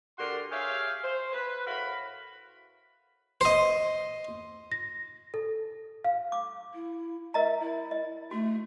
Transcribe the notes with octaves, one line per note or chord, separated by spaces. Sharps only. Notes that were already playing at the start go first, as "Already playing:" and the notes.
D3 F#4 G4 A#4 D5 C6
G4 G#4 C#5 E5 F5
C5
B4
A2 F#4 A#4 F5 B5
C5 D#5
A#6
A4
F5
D6
E4
A#4 D#5 E5 A#5
E4
D#5
A3 F#4